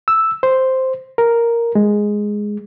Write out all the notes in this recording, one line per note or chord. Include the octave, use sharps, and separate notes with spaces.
E6
C5
A#4
G#3